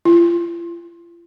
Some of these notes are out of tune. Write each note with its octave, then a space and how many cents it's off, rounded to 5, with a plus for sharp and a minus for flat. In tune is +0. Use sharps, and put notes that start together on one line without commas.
F4 -40